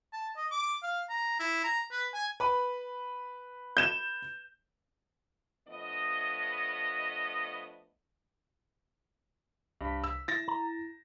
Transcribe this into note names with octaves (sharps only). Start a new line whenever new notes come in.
A5
D#5
D6
F5
A#5
E4
A#5
B4
G#5
B4 B5
G6 E7
F3 A3 B3 D4 D#5
C2 G2 B6
E6
E4 A6 A#6
A#5